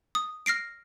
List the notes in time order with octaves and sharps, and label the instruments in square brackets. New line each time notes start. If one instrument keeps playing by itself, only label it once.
[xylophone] D#6
F6 A#6 C7 D7